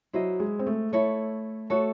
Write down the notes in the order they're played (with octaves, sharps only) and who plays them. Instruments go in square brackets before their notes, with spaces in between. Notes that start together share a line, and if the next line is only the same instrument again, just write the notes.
[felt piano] F#3 [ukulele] E4 C5 D#5
[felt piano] G#3
C4
A3
[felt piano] A3 [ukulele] E4 A4 C#5
[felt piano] A3 [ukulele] F#4 A4 C#5